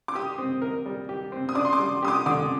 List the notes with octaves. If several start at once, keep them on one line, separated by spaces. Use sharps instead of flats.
D6
G4 D#6
C4
A#4
G3
G4
C4
D#6
D4 D6
C6
D6
G3
G4 D#6
D6
D3 D6